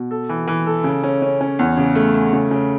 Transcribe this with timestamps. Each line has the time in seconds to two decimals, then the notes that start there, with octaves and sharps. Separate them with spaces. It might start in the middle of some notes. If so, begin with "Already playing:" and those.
Already playing: B2
0.11 A4
0.29 E3
0.48 E3
0.66 A4
0.84 C#3
1.03 C#4
1.22 C#4
1.41 C#4
1.59 E2
1.77 C#3
1.96 A3
2.14 A3
2.33 C#3
2.51 C#3